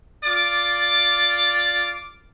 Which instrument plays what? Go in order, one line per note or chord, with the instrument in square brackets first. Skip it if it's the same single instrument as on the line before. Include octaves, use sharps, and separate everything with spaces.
[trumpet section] F4 D5 D6